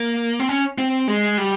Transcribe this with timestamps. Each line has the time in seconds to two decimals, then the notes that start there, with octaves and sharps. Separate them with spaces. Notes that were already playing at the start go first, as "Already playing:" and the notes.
Already playing: A#3
0.40 C4
0.49 C#4
0.78 C4
1.08 G#3
1.38 G3